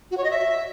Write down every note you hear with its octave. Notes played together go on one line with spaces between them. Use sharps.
F#4
C#5
D#5
E5